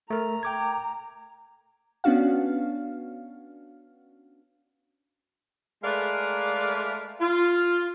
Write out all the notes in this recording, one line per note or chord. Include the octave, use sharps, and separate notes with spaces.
A3 A#4 A#5
G5 D6 G#6
B3 C#4 D4 F#4 F5
G#3 A3 A#4 B4 D5 F5
F4